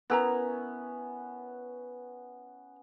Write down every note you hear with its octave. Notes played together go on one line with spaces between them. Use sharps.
B3 C#4 E4 A#4 A#5